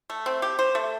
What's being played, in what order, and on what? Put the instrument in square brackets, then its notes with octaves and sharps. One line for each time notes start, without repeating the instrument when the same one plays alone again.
[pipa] A3
C4
G4
C5
A3